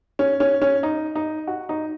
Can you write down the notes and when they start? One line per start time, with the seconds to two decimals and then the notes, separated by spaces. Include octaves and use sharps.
0.19 C#4
0.40 C#4
0.62 C#4
0.83 D#4
1.16 D#4
1.47 F#4
1.69 D#4